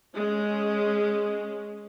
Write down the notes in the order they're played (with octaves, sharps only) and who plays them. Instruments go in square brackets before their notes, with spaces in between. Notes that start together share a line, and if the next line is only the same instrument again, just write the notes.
[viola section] G#3 C#4